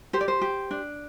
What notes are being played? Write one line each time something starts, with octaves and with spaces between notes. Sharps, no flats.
G4 C5
D5
C5
G4
D4